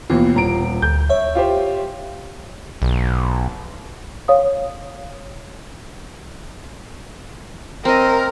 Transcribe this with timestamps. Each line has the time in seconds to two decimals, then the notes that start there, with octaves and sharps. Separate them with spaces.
0.10 D#2 B2 E3 F4
0.35 D#1 A#5 D7
0.82 D2 G6
1.09 C#5 E5
1.35 F4 G4 C5
2.82 B1
4.28 C#5 F5 D#6
7.85 C4 A#4 D#5